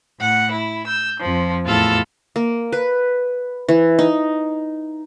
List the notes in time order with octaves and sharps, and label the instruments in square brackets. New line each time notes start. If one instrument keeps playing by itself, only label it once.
[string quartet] A2 F#5
E4
E6 G6
F2 F3
E2 A2 F4 A4 E6
[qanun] A#3
B4
E3
D#4